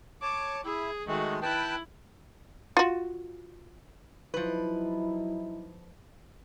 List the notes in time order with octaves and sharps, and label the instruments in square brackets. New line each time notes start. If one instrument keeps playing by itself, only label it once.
[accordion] C#5 A5 [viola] D6
[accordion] E4 [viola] G#4
[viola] D#3 F#4 [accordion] G#3 A3
[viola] E4 [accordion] B4 G5 A5
[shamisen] F4 F#4
[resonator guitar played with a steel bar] F3 B4 [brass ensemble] F#3 D#4 E4